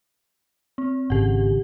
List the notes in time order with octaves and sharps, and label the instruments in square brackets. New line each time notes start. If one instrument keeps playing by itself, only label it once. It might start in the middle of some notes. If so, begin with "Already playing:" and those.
[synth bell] C4
[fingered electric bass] G#1 C#3 [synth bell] G4 F#5